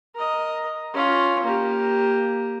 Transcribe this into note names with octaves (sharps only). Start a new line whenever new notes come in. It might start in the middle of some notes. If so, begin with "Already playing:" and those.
A#4 D#5
C#4 F4
A#3 G4